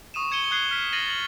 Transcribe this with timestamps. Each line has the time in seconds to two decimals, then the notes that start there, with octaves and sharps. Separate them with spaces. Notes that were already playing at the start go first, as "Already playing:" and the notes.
0.14 C#6 D#6 D#7 E7
0.31 C#6 G#6 C#7 D#7 G7
0.51 D#6 F#6 G#6 C7 G7
0.71 F6 B6
0.93 A6 A#6 C7 D#7 F#7
1.07 A6 F#7